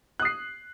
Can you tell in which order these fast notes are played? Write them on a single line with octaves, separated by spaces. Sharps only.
F#6 D#6 C7